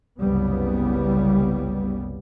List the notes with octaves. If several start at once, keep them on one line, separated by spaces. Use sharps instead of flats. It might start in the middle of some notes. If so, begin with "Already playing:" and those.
F#1 C2 C#3 G3 B3